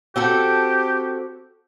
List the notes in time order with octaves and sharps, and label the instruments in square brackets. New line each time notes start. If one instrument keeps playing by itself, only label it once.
[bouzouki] C4 F#4 A4 [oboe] G4